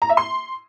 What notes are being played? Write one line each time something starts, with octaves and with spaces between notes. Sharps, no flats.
A#5
E5
C6